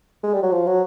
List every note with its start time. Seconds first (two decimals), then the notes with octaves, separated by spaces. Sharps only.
0.23 G#3
0.34 G3
0.42 F#3
0.52 F3
0.67 F#3